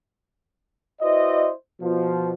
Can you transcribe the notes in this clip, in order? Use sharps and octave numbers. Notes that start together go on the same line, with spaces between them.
E4 F#4 B4 C5 D5 D#5
B2 F3